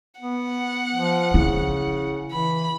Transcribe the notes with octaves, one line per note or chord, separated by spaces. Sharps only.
B3 F#5
F3
C#3 E4
E3 B5